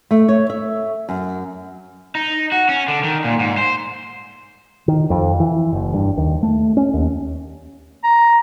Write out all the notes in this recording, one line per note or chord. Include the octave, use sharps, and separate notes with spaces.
A3
C#5
E5
F#2
D#4
F#4
C#4
D3
D#3
A#2
G#2
C5
D#3
F2
E3
F#1
G2
D#2
A3
C#4
D#2
A#5